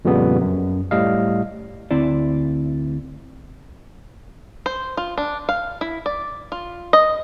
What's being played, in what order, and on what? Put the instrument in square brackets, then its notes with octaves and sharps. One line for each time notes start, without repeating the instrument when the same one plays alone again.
[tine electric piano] F2 A#2 C#3 G3 B3
F#2
A2 G3 D#5 F5
[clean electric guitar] D2 C4 E4 D5
[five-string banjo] C5
F4
D4
F5
E4
D5
F4
D#5